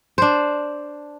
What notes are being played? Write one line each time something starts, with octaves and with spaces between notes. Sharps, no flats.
D4 C5